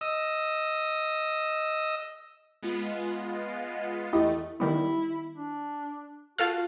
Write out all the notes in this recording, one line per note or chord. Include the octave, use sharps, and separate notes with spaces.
D#5 E6
G#3 B3 F4
E2 A3 E4 G4 D#5
D#3 G3 B3 E4
D4
F4 F#4 A4 F5